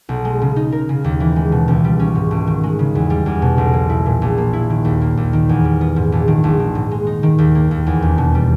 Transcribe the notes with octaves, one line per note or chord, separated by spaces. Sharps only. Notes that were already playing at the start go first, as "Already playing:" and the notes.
B1
G#3
C#3
D#4
A#4
C#3
D#2
E3
G#3
B2
C#2
G3
C#4
G#2
G#1
D#3
G#3
C#3
E2
G3
E2
B2
B1
A#3
E4
A#2
A#1
A#3
E4
D#3
D#2
A#3
D#2
D#3
E2
G3
B3
G#2
A#1
D#3
A#1
D#3
G#2
G#3
D#4
D#3
D#2
A#3
D#2
E2
E1
B2
G3